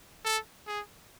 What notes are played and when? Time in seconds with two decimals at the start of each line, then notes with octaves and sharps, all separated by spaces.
0.25 A4
0.67 G#4